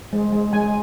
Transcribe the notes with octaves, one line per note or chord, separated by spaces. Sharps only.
G#3
G#3
G#3 G#5